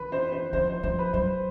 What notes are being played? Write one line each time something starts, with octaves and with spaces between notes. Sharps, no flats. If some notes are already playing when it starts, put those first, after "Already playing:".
Already playing: E3 B4
C5
C5
F3 C5
C5
F3 C5
B4
F#3 C5